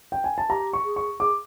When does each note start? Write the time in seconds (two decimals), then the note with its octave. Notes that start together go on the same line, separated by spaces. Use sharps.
0.12 G5
0.24 G#5
0.38 A5
0.49 G4 A#5
0.73 C#6
0.85 G#4
0.96 C#6
1.20 G#4 D6